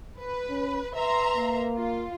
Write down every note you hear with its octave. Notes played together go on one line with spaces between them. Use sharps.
B4
C#4
B4 E5 A#5 C6
A#3
F4